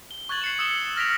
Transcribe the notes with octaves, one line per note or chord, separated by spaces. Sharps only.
G7
C#6 F#6 G#6 A6 F#7
C7 C#7 E7
D#6 E6 C#7 E7 G7
F6 A#6 B6 D7 F7